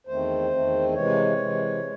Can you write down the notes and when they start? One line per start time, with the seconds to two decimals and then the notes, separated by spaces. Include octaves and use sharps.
0.07 E2 D#3 A3 C4 C5
0.50 E2 D#3 A3 C4
0.94 C3 E3 G#3 C#5
1.37 C3 E3 G#3
1.81 G#3